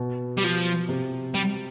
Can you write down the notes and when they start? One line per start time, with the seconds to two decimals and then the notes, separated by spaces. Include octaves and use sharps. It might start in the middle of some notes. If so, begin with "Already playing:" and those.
Already playing: B2
0.37 G3
0.44 F3
0.89 C3
1.34 G3